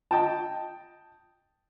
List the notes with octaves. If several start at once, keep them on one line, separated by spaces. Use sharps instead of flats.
D#5 G5 A5